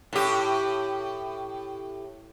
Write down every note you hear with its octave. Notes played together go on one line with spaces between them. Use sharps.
A2 G4